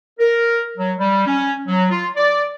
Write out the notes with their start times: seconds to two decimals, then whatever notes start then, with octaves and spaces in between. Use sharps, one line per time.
0.19 A#4
0.78 F#3
0.99 G3
1.26 C#4
1.68 F#3
1.90 F4
2.17 D5